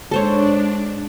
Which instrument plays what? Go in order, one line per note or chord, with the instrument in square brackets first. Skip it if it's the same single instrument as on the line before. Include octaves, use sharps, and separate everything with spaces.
[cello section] G#2 [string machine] D4 [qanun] A4 C5 C#5